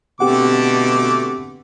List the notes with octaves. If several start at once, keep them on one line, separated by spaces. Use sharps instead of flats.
B2 D3 A3 C4 G4 F#5 D6